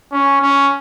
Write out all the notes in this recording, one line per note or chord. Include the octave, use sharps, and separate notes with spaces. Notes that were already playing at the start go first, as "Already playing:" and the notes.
C#4
C#4